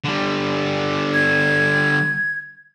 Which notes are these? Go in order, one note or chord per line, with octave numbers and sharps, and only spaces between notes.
D3 G3
G#6